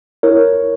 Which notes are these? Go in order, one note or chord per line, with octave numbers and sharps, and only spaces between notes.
E4 A#4 C#5